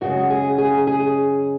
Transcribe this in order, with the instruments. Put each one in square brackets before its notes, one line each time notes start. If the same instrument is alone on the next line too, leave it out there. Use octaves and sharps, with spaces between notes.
[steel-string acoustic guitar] F#2 C#3 G#3 F#4
G#4
G#4
G#4